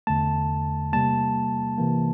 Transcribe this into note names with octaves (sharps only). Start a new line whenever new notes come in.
E2 D3 A3 A5
C3 G3 A#3 A5
C3 E3 A#3